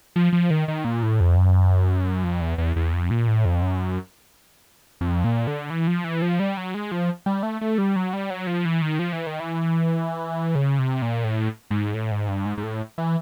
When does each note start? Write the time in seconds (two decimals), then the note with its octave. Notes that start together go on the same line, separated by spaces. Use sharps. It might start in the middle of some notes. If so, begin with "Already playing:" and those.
0.16 F3
0.33 F3
0.50 D#3
0.68 D#3
0.85 A#2
1.03 A2
1.20 F2
1.37 F#2
2.24 F2
2.41 E2
2.58 E2
2.76 E2
2.93 F2
3.11 A#2
3.28 A2
3.45 F2
3.62 F#2
5.01 F2
5.24 A#2
5.47 D3
5.70 E3
5.87 F3
6.04 E3
6.22 F3
6.40 G3
6.57 F#3
6.74 G#3
6.92 F3
7.26 G3
7.43 A3
7.61 A3
7.78 G3
7.96 F#3
8.13 G3
8.30 F#3
8.47 F3
8.65 E3
8.82 D#3
8.99 F3
9.13 E3
9.27 D#3
9.40 E3
10.55 C#3
10.79 C3
11.02 A#2
11.24 A2
11.71 G#2
11.94 A2
12.12 G#2
12.28 G2
12.45 G#2
12.58 G#2
12.63 A2
12.98 E3